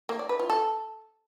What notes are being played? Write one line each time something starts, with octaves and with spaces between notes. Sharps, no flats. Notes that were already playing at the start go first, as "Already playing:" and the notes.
A#3
D5
B4
F4
A4